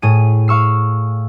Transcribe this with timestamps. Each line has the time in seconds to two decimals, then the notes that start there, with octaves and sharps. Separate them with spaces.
0.02 A2 G#4 D#7
0.48 F5 C#6 E6 C7